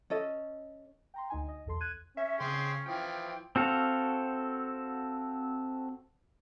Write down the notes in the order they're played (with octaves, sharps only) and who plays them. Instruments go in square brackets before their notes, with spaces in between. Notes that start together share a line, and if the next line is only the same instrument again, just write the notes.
[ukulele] C#4 A4 D#5
[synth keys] G5 A#5 C6
D2 D#4 G#5
D#5
B1 E2 A4 C6
F#6 G#6 D#7
[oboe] C#4 [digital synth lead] E5
[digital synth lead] C#3 [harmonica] G#4 G5 C6
[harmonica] E3 F3 [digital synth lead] G5
[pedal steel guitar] C4 F#4 A4 F5